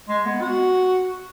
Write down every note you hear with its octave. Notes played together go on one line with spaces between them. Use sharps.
G#3
B3
F#4